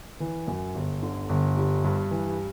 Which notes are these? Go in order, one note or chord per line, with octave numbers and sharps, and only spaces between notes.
E3
F#2
G1
D3
G1
G3
G2
E3